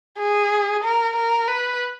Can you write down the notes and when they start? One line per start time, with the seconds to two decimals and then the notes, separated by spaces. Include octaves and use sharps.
0.19 G#4
0.83 A#4
1.16 A#4
1.48 B4